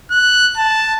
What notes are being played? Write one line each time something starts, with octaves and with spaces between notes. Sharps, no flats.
F#6
A5